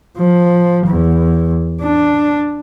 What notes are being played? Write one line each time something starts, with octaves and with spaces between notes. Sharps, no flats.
F3
E2
D4